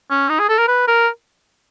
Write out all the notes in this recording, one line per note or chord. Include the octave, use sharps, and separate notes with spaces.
C#4
D#4
G#4
A4
A#4
B4
A#4